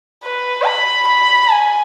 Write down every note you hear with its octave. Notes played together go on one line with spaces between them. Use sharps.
B4
B5
B5
G#5